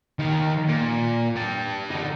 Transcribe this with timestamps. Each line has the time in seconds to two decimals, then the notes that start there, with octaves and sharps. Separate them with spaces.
0.19 D#3 F5
0.68 A#2
1.36 G4 A5
1.90 D3 D#4